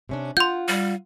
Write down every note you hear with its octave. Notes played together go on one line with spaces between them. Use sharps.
C3 C#4 D4
F4 F#5 C6 G6
G3